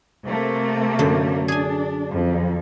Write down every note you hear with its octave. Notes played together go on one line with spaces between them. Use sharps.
C3 A3 A#3
F#2 D3
D4 G#4 G#5
F2